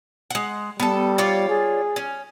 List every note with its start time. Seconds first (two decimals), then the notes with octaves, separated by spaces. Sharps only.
0.30 G#3 F#5
0.80 G3 B3 A4
1.18 F4 C#5 D5
1.49 G#4
1.96 C#4